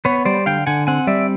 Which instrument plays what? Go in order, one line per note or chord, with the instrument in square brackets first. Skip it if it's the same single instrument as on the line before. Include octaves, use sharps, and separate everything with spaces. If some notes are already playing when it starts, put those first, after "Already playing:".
[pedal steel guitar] B3 B4 C#5
G3 C5 D5
D3 F5 G5
D3 F#5 G#5
C4 F#5 G#5
G3 D5 E5